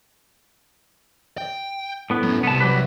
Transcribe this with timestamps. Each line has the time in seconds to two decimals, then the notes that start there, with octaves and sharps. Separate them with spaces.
1.38 G5
2.10 A2 B3
2.23 F#3 C#4
2.43 C2 B3 A5
2.60 F#3 G4 B4